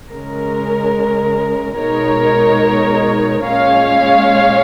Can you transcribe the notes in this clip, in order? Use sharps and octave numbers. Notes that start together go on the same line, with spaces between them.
C#3 G#3 C#4 A#4
B2 G#3 D#4 A#4 C#5
A#2 G#3 C#4 C#5 F5